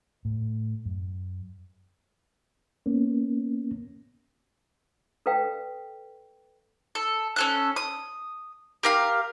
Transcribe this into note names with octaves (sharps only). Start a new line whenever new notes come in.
A2
F#2
A#3 B3 C#4
A4 B4 D5 F5 G5
A4
C#4 A4 F#6
D#6
G4 A#4 F5